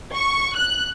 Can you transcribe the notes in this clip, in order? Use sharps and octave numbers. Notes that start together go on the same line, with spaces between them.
C#6
F#6